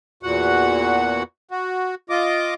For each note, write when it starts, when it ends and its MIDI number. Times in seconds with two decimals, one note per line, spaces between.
0.23 1.23 40
0.23 1.23 46
0.23 1.23 66
0.23 1.23 78
1.51 1.95 66
2.10 2.54 65
2.10 2.54 75
2.10 2.54 86